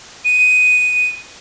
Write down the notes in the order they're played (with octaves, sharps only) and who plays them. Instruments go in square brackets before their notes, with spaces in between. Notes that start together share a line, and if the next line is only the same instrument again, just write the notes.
[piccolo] D#7